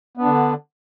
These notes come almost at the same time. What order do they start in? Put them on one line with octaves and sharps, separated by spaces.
B3 D4 D3